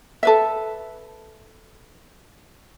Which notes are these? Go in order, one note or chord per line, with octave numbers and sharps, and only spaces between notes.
A4 B4 E5